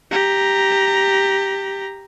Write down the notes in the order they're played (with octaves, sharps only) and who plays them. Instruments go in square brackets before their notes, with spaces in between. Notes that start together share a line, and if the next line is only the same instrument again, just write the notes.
[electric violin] G4 A#5